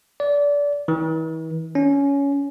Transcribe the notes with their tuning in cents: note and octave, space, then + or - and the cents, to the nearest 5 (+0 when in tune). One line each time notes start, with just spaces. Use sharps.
D5 -25
E3 -40
C#4 +15